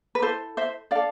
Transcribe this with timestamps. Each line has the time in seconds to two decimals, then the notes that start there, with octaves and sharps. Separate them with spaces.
0.15 B4
0.22 E4 A4 C5
0.57 C5 E5
0.91 D4 A4 D5 F5